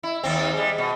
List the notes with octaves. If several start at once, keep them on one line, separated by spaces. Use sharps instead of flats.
E4
D#2 C4
G3 G#3
B2